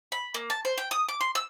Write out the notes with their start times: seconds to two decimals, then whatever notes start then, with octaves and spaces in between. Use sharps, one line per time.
0.12 B5
0.34 A#3
0.50 A5
0.65 C5
0.78 G5
0.91 D#6
1.08 D6
1.21 C6
1.35 E6